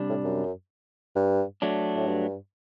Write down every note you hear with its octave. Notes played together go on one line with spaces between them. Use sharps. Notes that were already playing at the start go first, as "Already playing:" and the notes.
Already playing: C3 G3 D4
A2
F#2
G2
F#3 A3 D4
A2
G2